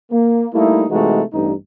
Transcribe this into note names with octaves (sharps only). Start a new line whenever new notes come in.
A#3
G3 A3 A#3 D#4 E4
C3 E3 G#3 A3 D#4 F#4
A1 G2 D#4